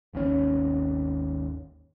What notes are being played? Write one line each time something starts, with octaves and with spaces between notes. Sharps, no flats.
G#1 D#2 B2 C#4